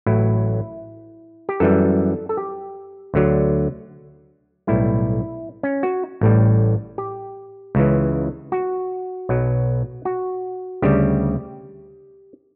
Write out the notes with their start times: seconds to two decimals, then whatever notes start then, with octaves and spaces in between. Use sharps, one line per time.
0.06 A1 A2 F#3 E4
1.49 G4
1.60 F#2 E3 G3 A4
2.29 A4
2.37 G4
3.14 D2 D3 F#3
4.67 B1 A2 G3 E4
5.63 C#4
5.83 F#4
6.21 A1 A2 G3
6.98 G4
7.75 C#2 C#3 E3
8.52 F#4
9.29 B1 B2 F#3
10.05 F#4
10.82 D2 C#3 G3 G4